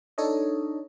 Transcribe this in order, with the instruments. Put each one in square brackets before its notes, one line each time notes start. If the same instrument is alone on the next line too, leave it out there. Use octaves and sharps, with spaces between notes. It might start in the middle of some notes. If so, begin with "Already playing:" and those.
[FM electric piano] D4 D#4 A4 C#5 D#5